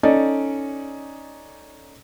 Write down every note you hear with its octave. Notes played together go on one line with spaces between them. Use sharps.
C#4 D#4 A4 D5